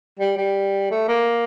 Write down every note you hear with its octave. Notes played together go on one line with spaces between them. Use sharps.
G3
G3
A3
A#3